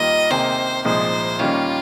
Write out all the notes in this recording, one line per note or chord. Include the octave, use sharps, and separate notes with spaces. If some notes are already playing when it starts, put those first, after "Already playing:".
Already playing: D#2 D#3 G3 A#3 F4 D#5
C3 D#3 A#3 D#4 G#4 C5
C2 A#2 F3 G#3 D#4 C5
D#3 G3 A#3 C#4 F4